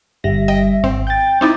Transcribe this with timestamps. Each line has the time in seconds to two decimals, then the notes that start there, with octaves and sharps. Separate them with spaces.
0.24 G1 G3 E5 A#6
0.48 D#5 G5
0.84 G#1 C4
1.07 G5 G6 A6
1.41 C4 D#4 E4 D6